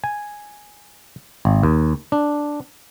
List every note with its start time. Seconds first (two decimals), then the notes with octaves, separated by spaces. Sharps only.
0.04 G#5
1.45 G#1
1.63 D#2
2.12 D4